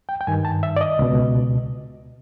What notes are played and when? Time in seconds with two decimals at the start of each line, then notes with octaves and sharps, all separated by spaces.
0.09 G5
0.21 G5
0.27 G2 D#3 G#5
0.45 A5
0.63 E5
0.76 D5
0.81 D#5
0.99 C#2 B2